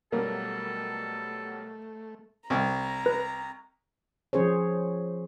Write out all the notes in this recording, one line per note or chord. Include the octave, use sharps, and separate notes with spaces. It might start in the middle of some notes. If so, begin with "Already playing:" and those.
B2 F#3 G3 A3 A#3 A4
C2 A#5
B4
F3 C#4 G#4 C5 C#5